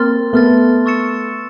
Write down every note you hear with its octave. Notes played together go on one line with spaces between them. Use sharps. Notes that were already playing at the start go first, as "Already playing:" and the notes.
Already playing: A#3 C4 C6 F6 A6
A3 B3 C6 F6 A6
C#6 E6 A6 C#7 E7